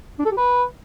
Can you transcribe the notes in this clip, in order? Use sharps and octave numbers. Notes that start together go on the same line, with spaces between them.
D4
A4
G4
B4